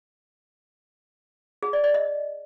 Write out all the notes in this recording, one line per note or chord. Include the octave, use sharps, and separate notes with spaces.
G#4
D5
D5
D#5